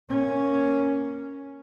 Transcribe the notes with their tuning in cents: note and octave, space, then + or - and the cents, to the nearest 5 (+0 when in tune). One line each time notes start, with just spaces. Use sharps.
A#3 +0 C#4 +0